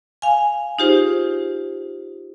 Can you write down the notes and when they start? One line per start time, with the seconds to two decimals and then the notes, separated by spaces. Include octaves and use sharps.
0.22 F5 G#5
0.79 D#4 F4 G4 G#4 C5